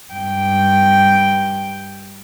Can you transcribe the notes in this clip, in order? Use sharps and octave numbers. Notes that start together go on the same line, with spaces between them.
G2 G5